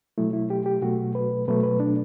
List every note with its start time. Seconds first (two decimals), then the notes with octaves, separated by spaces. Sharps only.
0.18 B2 F#3 A3 E4
0.33 E4
0.50 G4
0.66 G4
0.82 B2 F#3 A3 F#4
1.15 B4
1.48 B2 F#3 A3 B4
1.63 B4
1.80 D4